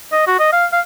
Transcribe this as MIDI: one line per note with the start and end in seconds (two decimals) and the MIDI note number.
0.12 0.27 75
0.27 0.36 66
0.39 0.50 75
0.53 0.66 77
0.72 0.80 77